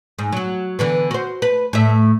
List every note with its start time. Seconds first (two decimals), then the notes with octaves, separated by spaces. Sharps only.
0.19 G#2
0.32 F#3 F#4
0.79 D3 E3 B3
1.11 F#4 C5
1.42 B4
1.73 A2 E5